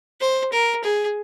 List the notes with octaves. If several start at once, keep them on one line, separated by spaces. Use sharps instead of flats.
C5
A#4
G#4